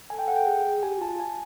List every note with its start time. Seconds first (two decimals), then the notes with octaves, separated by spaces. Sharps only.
0.10 A4 G#5
0.19 G5
0.28 F#5
0.36 G5
0.47 G#4
0.83 G4 G#5
0.98 F#4
1.01 F4 A5
1.20 G#5